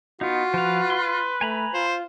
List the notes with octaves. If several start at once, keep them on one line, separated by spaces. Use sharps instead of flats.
B3 D#4 F4 F#4
F3 B4 F5
C6
A3 G#5 A#5 B5
F4 C5